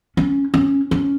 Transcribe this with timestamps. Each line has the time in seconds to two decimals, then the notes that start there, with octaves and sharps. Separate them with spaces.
0.17 C#4
0.54 C#4
0.91 C#4